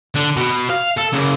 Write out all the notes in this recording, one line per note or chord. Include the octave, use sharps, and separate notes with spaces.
D3
B2
F5
A4
C#3 A#3